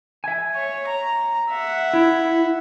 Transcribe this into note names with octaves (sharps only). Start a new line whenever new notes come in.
E5 G#5
C#5
A#5
E5 F#5
E4